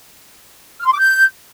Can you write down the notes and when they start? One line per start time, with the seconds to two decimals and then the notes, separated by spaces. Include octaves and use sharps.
0.80 F6
0.86 C6
0.92 D6
0.98 G6